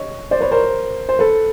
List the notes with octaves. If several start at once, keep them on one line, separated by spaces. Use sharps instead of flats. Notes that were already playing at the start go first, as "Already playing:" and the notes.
Already playing: C#5 D#5
C5 D5
B4 C#5
A#4 C5
C5
A4 B4